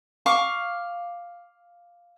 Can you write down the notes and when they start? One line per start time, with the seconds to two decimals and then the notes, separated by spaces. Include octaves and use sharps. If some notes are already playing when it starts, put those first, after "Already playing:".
0.26 F5 C#6 D6